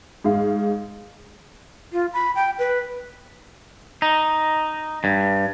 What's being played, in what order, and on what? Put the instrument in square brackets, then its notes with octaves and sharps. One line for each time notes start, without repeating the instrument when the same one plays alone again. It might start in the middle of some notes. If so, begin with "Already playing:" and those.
[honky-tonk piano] G#2 F5
[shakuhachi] F4
B5
G5
B4
[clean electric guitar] D#4
G2